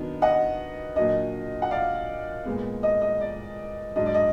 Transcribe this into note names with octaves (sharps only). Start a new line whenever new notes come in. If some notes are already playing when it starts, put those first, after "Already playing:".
Already playing: D#3 F#3 B3 D4
D#5 F#5
A#2 F#3 D4 D#5
F#5
D5 F5
A#2 G#3 B3
D#5
D#5
D5
G#2 F#3 D4 D#5
D5
D#5